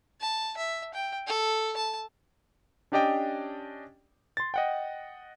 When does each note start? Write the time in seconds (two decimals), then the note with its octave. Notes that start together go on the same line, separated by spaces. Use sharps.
0.21 A5
0.57 E5
0.94 G5
1.27 A4
1.77 A5
2.92 C#4 D4 G4 D5 D#5 G5
4.37 C6 A6
4.54 D#5 F#5 G5